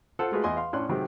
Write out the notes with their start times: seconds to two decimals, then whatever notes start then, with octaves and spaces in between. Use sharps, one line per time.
0.19 F4 A4 C5 F#5
0.32 G#3 A3 F4 F#4 G#4 B4
0.44 E2 D#5 G#5 C6
0.57 F5 C6
0.73 A2 C#4 D4 C6 F#6
0.89 C3 D#3 F#3 G#3 C4